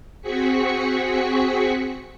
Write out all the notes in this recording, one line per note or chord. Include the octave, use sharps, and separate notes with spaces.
C4 F#4 G#4 C#6 B6 C#7